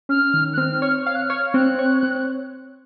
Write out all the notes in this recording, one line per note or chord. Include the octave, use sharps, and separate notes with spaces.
C#4 F6
D#3
F#6
C4 F6
C#5
F5 F6
F#6
C#5 F6
C4 F#6
C#5
C4